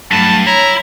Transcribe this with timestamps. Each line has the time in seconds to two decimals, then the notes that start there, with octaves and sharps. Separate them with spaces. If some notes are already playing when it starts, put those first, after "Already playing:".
0.12 G2 F#3 A3 A5 B5
0.46 E4 C#5 A#5